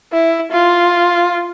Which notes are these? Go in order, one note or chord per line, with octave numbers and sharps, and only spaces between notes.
E4
F4